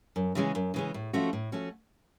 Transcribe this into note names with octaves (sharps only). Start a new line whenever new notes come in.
F#2
C#3 E3 G#3 C#4
F#2
C#3 E3 G#3 C#4
A2
F3 A3 C#4 F#4
A2
F3 A3 C#4 F#4